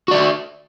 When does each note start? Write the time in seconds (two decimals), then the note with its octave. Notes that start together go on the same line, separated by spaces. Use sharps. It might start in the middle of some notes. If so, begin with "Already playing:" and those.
0.08 F#4
0.11 D5
0.14 E5